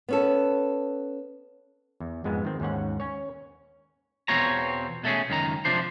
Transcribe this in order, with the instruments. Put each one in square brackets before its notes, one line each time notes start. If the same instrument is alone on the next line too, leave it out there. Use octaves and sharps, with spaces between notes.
[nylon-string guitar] B3 C#4 A4
[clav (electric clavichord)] E2
F2 G#2 G#3 B3
D#3 C4
D#2 G#2 C#4 F#5
C#4 C#5
[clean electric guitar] E2 B2 C4 F4 C#5 A#5
B2 A3 C#4 G#4
C#2 F#2 D#3 A#5
C3 F3 D4 C5